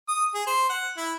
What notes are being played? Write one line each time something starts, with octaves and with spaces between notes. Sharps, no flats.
D#6
G#4
C5
F#5
E4